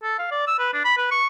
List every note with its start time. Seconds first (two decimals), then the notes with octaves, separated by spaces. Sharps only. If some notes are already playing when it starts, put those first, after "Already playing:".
0.03 A4
0.19 F5
0.31 D5
0.47 E6
0.59 B4
0.73 D4
0.85 B5
0.97 B4
1.11 C#6